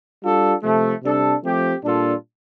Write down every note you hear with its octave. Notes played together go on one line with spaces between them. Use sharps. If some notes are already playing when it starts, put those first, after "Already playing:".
G3 D4 F4 A4
C3 F3 A3
C3 G3 D4 A4
F3 A3 C4 G4
A#2 G3 D4 F4 A4